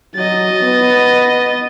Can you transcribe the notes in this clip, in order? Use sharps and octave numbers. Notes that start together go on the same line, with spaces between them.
F#3 D#5 A6
B3